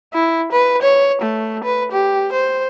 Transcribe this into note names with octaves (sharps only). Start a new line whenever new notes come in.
E4
B4
C#5
A3
B4
G4
C5